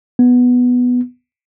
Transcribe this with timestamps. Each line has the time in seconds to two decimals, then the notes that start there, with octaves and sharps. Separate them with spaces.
0.19 B3